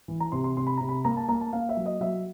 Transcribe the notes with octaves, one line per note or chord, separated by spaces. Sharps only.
E3
A#5
C3 C6
C6
C3 C6
B5
C3 A#5
B5
A#3 A#5
A5
A#3 A#5
A5
A#3 F5
E5
F#3
D#5
F#3 E5